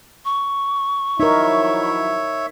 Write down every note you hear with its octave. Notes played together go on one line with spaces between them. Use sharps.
C#6
F3 F#3 D#4 E4 A#4 C#5 E5